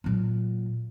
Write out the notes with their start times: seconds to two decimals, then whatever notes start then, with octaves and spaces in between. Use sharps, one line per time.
0.04 A#2 F#3